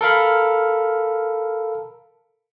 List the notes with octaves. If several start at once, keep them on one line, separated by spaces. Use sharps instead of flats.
A4 A#4 F5 B5